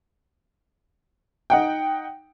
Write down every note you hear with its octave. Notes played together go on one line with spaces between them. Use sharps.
D#4 F#5 G5